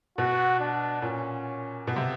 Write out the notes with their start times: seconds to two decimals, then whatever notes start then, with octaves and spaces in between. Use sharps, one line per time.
0.18 B2 F#4
0.60 D4
1.02 A#2 C#4
1.87 B2
1.96 C3